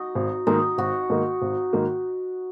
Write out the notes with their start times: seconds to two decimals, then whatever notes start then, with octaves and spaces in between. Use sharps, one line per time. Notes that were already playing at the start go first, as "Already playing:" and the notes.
Already playing: D#4 F#4
0.15 G#1
0.47 G#2 D#3 A#3 D#4
0.78 G#1 F#4
1.10 G#2 D#3 A#3
1.42 G#1
1.73 G#2 D#3 A#3